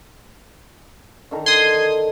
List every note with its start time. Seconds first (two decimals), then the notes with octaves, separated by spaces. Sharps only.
1.31 D3 D#3 A#5
1.46 C6 D#6 G#6